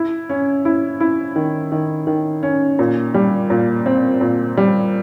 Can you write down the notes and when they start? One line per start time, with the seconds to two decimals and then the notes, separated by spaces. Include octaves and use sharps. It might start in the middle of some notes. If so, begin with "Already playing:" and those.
Already playing: E4
0.29 C#4
0.65 E4
1.00 E4
1.36 D#3
1.72 D#3
2.07 D#3
2.43 C#4
2.79 A#2
3.14 G3
3.50 A#2
3.86 C4
4.21 A#2
4.57 G3